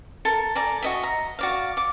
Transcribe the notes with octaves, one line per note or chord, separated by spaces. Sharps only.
A4 A#4
D5 G#5 A#5
F#4 D#5 E5
A#5
F#4 D5 F5
D6